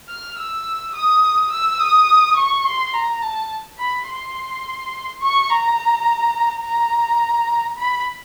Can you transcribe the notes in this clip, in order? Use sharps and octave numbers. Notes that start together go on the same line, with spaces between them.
F6
E6
D#6
E6
D#6
C#6
C6
A#5
A5
B5
C6
C#6
A#5
A#5
B5